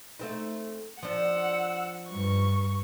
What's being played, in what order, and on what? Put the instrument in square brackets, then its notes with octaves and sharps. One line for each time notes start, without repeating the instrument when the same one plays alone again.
[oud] A3 C4 D#4
[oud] F3 D4 [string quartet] F#5 E6
[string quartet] G2 C#6